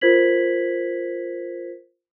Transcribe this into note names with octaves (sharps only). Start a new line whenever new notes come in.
F4 A#4 C5 G#6 B6 F#7